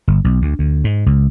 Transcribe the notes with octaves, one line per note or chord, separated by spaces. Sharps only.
G1
B1
D2
D2
G#2
C#2